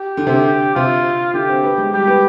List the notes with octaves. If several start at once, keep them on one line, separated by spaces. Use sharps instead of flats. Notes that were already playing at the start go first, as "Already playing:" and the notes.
Already playing: G4
D3
C3
D3
G4
C3 F4
D3 G4
C4
B3
G#3
G3 G4
B3